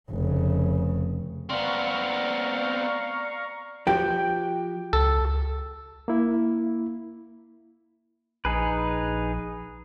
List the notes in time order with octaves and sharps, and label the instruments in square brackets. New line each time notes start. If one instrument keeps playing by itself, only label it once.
[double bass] F1 C#3
[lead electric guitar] B3 C4 [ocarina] D5 [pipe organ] F5 A#5 C#6
[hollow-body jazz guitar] F3 F#4 G4 [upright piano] G5 G6
[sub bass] C#2 [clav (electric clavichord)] A4
[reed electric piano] A#3 E4
[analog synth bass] A#1 [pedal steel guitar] D#4 G#4 B4